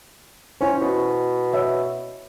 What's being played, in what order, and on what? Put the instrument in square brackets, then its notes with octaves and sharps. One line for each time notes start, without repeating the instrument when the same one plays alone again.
[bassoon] C#4 [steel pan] E4 C5
[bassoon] B2
[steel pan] C#5 E5